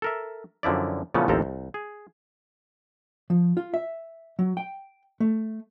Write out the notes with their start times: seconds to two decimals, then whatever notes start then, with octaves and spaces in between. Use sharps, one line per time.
0.02 A4 A#4 E5
0.63 F#2 D3 F3 E4 D5
1.14 A#2 C#3 E3 F3 A3 B3
1.28 A1 D#2 F3 C4 A4 A#5
1.42 C2
1.74 G#4
3.30 F3
3.57 F4
3.74 E5
4.39 F#3
4.57 G5
5.20 A3